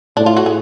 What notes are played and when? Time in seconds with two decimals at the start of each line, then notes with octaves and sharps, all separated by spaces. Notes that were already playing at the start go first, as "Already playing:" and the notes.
0.17 A2 D4
0.26 F4
0.37 F#4
0.46 G#4